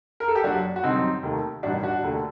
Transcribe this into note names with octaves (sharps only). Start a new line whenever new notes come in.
A#4
A4
G4
F#1 F#2 F#3 D4 F#4
F#4
F#2 D3 G3 C4 D#4
D#2 D#3 A3
A1 G2 D#3 D4 F#4
D4 F#4
D#2 D3 A3